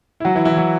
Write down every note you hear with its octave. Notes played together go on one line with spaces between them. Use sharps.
E4
F#3 F#4
E3 E4
E3 E4
F#3 F#4